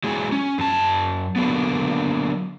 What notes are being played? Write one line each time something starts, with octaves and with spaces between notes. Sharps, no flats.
F#3 G#3 E4 G#4
C#4
F#2 A5
D3 F#3 A#3 B3